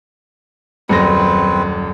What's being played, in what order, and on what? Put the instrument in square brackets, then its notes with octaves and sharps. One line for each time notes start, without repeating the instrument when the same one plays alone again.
[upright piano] D#1 F#2 A#6 [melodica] C4 B4